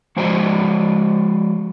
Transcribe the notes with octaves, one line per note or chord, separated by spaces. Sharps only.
F3 G#3 F#4 C5 D5 D#5